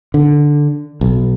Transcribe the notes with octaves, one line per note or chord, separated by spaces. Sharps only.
D3
B1